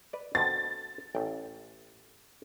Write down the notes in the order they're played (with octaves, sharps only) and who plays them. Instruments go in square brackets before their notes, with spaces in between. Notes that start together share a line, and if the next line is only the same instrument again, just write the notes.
[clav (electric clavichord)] B4 D5
[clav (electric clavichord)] B2 D3 C4 [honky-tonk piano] A6
[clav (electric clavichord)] A1 G5